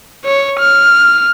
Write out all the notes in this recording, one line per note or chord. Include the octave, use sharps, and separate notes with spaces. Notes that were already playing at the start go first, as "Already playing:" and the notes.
C#5
F6